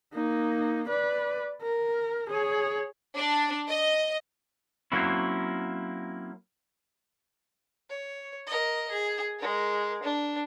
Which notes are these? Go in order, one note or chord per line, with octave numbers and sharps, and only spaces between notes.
A#3 D#4
B4 D5
A#4
G#4 C#5
D4
D#5
F#3 A#3 C4 C#4 E4
C#5
A#4 D#5
G#4
G#3 A#4
D4